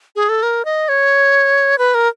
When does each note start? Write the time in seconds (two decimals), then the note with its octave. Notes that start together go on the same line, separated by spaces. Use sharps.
0.16 G#4
0.29 A4
0.43 A#4
0.65 D#5
0.89 C#5
1.78 B4
1.95 A#4